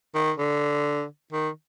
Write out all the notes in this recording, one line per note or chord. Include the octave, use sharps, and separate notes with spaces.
D#3
D3
D#3